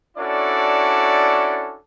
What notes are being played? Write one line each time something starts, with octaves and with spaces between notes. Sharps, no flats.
C#4 D4 E4 F#4 A4 D5